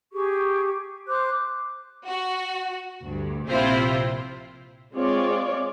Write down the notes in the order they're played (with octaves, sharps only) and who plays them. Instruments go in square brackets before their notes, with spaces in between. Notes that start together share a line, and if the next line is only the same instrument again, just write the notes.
[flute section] G4 G#4 C#6
C5 D6 F#6
[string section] F#4
D2 G2
A#1 C3 C4 E4 F4 C5
[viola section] G#3 C4 F4 C#5 D5